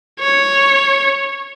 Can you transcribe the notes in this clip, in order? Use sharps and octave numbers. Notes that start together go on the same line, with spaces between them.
C#5